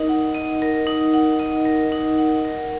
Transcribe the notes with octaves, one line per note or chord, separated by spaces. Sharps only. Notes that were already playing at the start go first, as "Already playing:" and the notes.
Already playing: D#4 A#4 D#5
F#5
D#5
A#4
D#4
F#5
D#5
A#4
D#4
F#5
A#4